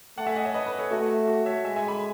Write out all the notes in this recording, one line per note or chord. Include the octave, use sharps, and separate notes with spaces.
A3 F#5 A5
E5 G#5
D#5 F#5
C#5 E5
B4 D#5
B4 D#5
A4 C#5
A3 F#4
F#4
C#5 E5
G#3 E5 G#5
E5 G#5
G#5 B5